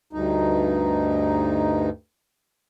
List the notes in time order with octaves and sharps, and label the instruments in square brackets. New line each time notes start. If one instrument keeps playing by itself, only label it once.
[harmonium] D2 G2 D#4